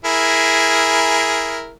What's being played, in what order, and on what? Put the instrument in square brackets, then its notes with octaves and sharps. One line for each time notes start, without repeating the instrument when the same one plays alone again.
[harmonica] E4 G#4 A#4